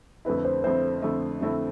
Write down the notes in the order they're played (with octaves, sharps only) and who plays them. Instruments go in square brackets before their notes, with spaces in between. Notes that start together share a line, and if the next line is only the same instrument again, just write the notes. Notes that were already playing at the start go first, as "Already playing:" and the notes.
[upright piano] F2 D3 A3 C4 E4 [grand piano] B4
[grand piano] C5
[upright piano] F2 D3 A3 C4 E4 [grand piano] C5
[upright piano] F2 D3 A3 C4 E4
F2 D3 A3 C4 E4